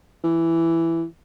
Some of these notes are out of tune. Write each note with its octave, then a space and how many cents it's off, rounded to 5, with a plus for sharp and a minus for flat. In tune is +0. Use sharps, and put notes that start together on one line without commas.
E3 +5